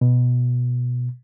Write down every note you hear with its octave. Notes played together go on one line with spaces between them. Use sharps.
B2